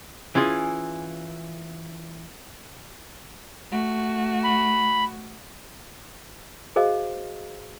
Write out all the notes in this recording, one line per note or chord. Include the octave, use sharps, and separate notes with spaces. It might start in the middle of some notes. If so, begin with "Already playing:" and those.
E3 C#4 F4 G#4
A3 F#4
B5
F#4 G#4 C5 D#5 F5